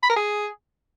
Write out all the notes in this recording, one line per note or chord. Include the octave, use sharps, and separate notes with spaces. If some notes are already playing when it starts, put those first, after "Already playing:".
B5
A#4
G#4